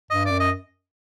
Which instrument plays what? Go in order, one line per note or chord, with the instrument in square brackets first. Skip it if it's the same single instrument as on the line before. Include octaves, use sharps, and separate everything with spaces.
[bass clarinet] G2 [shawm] D#5
[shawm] D5
[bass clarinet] F#2
[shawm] D#5